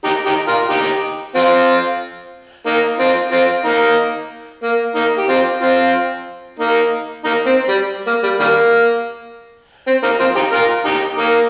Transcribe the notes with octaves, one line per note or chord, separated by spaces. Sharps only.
D#4 G4
D#4 G4
F4 A#4
D#4 G4
C4 F4
A#3 D#4
C4 F4
C4 F4
A#3 D#4
A#3
A#3 D#4
G4
C4 F4
C4 F4
A#3 D#4
A#3 D#4
C4
G3
A#3
G3
D#3 G3 A#3
C4
A#3 D#4
C4 F4
D#4 G4
F4 A#4
D#4 G4
A#3 D#4